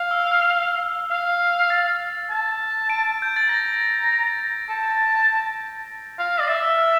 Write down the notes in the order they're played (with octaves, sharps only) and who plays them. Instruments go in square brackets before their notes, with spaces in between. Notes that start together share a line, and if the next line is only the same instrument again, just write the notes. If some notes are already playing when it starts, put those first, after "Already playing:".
Already playing: [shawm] F5
[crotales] E6
F6
[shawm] F5
[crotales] A6
[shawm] A5
[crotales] D7
G6
A6
[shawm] A#5 [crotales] A#6
[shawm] A5
F5
D5
E5
[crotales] E6
F6